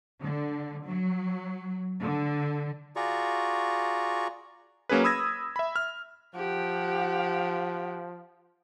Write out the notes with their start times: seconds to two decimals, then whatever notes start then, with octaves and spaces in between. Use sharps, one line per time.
0.22 D3
0.85 F#3
2.01 D3
2.96 F4 F#4 G#4 D5 A#5 C#6
4.89 F#3 A#3 C#4 G#4 B4
5.04 B5 D#6 E6 G#6 A#6
5.56 E5 B5
5.76 F6
6.35 F3 G4 F#5